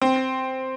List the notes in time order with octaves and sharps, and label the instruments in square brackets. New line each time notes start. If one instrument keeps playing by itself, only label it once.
[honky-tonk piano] C4